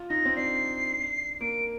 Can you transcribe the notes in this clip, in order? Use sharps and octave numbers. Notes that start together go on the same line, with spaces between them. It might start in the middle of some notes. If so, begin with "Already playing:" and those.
Already playing: F4
D#4 A#6
C4
D4 C7
A#3 D7